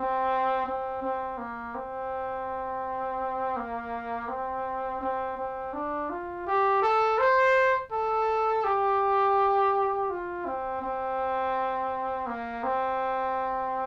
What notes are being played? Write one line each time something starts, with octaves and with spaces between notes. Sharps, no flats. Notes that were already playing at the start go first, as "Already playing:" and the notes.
Already playing: C4
C4
C4
A#3
C4
A#3
C4
C4
C4
D4
F4
G4
A4
C5
A4
G4
F4
C4
C4
A#3
C4